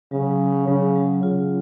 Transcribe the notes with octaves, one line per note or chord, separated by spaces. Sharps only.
C#3 F#3
F#3
C#3 F#3
F#3
C#3 F4